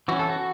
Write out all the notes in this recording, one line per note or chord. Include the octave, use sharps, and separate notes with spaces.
E3 C#4 F#4
A4
F#4